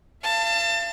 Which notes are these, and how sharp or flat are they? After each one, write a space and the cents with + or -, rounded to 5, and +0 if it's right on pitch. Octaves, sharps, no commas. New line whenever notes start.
F5 -40 A5 +25